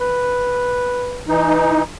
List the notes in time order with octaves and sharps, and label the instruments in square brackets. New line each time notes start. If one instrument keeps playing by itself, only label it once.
[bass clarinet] B4
[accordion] E3 D#4